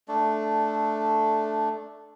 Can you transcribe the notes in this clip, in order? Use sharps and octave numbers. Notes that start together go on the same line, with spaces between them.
A3 D4